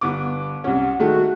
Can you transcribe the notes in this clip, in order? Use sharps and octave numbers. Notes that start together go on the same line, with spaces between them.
G1 B3 D6
C2 C#4 F#5
D#3 G#3 A3 F#4